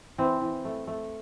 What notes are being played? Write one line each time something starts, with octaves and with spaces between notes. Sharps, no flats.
E3 C4
E3
A3
A3